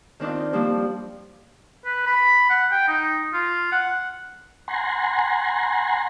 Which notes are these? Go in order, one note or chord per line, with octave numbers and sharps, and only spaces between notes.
D#3 C4 D4 D#4 F4
F3 G3 A#3 C4 D4
B4
B5
F#5
G5
D#4
F4
F#5
F#5 G#5 A#5 C6